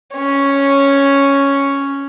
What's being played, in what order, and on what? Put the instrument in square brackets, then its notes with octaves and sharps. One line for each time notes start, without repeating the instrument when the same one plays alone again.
[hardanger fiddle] C#4 C#5